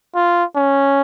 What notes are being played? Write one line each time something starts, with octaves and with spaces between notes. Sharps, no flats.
F4
C#4